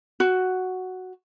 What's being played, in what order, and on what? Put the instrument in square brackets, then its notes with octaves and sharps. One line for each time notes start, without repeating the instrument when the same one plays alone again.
[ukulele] F#4